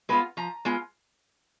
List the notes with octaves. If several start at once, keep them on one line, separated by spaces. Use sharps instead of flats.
G#3 B3 F4 B4
F3 A#5
G#3 B3 F4